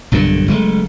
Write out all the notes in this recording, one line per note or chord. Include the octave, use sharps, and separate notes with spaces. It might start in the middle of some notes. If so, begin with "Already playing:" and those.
B1 G2 A#2 D3
F#1 G#3 A3